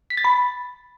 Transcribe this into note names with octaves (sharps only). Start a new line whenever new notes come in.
B6
A6
B5